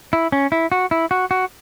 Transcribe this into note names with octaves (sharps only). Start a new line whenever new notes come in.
E4
C#4
E4
F#4
E4
F#4
F#4